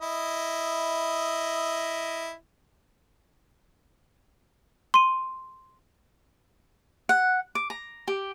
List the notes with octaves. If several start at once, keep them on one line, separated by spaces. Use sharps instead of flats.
E4 D#5
C6 D#7
F#5
D6
A#5
G4